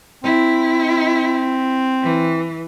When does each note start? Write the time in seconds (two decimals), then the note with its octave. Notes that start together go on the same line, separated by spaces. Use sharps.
0.24 C4 E4
2.02 E3